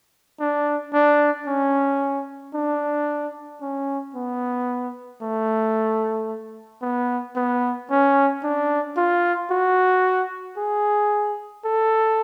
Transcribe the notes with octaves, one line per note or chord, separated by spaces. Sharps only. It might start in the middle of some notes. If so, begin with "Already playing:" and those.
D4
D4
C#4
D4
C#4
B3
A3
B3
B3
C#4
D4
F4
F#4
G#4
A4